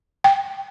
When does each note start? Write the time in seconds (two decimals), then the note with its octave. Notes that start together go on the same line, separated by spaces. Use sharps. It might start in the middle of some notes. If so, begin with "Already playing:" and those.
0.24 G5